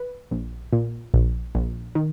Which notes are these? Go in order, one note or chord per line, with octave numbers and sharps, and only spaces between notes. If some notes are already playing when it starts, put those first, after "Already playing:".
Already playing: B4
A#1
A#2
A#1
A#1
D#3